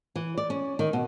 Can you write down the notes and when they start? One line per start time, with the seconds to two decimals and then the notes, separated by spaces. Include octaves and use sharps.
0.16 E3
0.37 D5
0.50 C#4
0.79 D#3
0.93 B2